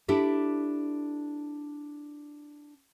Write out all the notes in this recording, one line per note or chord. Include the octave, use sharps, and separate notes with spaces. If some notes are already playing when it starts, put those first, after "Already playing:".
D4 E4 G4 A4